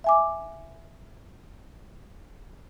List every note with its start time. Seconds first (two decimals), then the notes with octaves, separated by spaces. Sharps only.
0.04 E5 G#5 D6